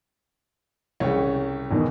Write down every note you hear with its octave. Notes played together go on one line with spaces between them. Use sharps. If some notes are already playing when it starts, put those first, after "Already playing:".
C2 C#3 C#5 G5
E2 B2 D#3